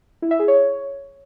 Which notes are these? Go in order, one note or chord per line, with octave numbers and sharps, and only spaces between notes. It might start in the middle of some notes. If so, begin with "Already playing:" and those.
E4
E5
G#4
C#5